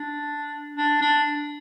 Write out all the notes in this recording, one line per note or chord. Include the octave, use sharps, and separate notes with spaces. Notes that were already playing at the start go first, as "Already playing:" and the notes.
Already playing: D4
D4
D4